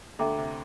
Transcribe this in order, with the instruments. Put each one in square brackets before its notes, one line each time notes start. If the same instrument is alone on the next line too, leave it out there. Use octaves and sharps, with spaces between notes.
[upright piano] D2 D3 [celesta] A4 E5 G5 A#5 D6
[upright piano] C3